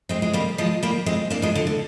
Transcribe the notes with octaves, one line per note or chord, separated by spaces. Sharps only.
G#3 C4
G#3
G3 A#3
F3 G#3
G3 A#3
G#3 C4
A#3 D4
F3 G#3
D3
D3